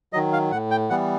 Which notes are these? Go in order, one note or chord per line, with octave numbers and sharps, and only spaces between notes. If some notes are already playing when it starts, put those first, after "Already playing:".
D#3 F#3 D#5
F5
A2 F#5
G5
E3 G3 B3 F#5